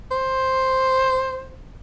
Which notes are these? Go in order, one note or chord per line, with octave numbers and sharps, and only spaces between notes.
C5